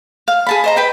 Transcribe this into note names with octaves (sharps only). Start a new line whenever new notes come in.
F5
G#4 A5 B5
C5 D#5 A#5
B4 G5 B5